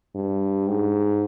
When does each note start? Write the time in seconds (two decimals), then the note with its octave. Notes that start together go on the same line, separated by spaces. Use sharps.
0.15 G2
0.68 G#2